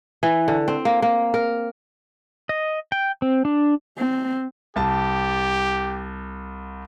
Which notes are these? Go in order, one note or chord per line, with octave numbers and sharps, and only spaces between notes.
E3
D3
C4
A#3
A#3
A#4
D#5
G5
C4
D4
C4
C2 G4 A5